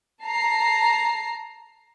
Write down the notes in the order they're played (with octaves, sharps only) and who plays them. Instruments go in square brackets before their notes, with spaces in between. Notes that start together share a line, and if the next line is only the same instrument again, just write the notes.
[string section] A5 A#5 C7